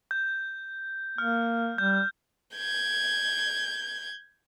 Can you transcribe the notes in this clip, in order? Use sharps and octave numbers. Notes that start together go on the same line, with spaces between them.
G6
A#3 F6
G3 G6
G6 G#6